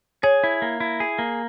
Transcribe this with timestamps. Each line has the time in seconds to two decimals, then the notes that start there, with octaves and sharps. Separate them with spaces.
0.23 G#4 C#5
0.44 E4
0.62 A#3
0.80 E4
1.00 G#4
1.19 A#3